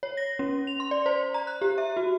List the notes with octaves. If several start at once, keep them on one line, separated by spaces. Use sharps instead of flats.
C#5
A#6
C#4
F7
C6
D5
C5
A#5
F#6
G4
E5
F#4